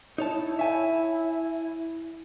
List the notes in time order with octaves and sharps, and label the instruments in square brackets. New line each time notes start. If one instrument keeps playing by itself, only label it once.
[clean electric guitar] D#4 C#5 A5 [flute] E4
[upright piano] C#5 G#5 A5 [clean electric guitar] E5